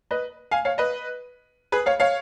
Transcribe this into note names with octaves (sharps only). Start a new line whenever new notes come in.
B4 D#5
F5 G#5
C#5 F5
B4 D#5
G#4 B4
C#5 F5
C#5 F5